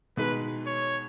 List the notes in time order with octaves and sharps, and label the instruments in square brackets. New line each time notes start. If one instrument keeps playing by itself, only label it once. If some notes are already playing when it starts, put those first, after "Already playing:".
[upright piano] B2 G#3 D#4 [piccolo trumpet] B4
[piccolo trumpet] C#5